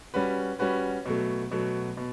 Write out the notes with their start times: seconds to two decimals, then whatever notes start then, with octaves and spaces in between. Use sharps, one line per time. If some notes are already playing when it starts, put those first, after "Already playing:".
0.14 G3 C#4 F#4 B4
0.59 G3 C#4 F#4 B4
1.05 B2 F#3 A3
1.51 B2 F#3 A3
1.97 B2